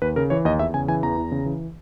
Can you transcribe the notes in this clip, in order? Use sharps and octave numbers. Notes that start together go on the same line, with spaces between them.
D#2 B4
C#3 A#4
E3 C#5
D#2 D#5
E2 E5
C#3 G#5
E3 G#5
E2 A#5
E2
C#3
E3